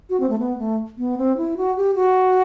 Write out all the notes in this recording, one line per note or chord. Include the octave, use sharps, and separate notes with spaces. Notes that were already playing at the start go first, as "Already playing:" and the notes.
F#4
C4
A3
B3
A3
B3
C4
E4
F#4
G4
F#4